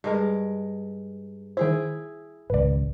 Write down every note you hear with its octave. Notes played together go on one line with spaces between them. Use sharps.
G2 G#3 A#4
D#3 E4 G#4 C5 G5
G#1 C#2 B4 D5